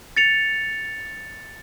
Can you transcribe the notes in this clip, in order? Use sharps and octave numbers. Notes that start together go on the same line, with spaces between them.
A6 C#7 F7